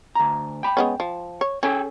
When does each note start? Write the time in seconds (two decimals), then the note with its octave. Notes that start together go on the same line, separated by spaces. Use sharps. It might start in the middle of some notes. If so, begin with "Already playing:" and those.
0.15 D2 A#5
0.63 G5 B5
0.77 G#3 B3 C#4
1.00 F3
1.41 C#5
1.63 C#4 G#4 A4 G5